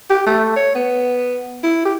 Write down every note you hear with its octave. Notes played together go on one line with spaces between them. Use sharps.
G4
A3
C#5
B3
E4
G4